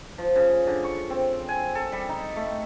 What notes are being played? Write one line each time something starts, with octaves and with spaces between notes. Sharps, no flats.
F3
C#3
D3
C#6
C4
G#5
A4
G3
D#4
A3